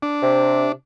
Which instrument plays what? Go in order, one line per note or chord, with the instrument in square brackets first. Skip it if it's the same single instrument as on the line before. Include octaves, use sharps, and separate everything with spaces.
[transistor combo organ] D4
[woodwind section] C3